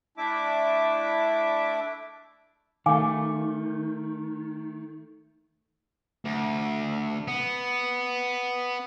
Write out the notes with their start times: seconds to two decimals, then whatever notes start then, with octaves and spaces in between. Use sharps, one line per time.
0.18 A3 D4 E4 E5 D6
2.86 D#3 A3 F5 G#5 D6
6.25 D2
7.28 B3